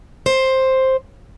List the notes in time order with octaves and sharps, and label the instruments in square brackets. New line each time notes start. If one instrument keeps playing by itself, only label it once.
[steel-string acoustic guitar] C5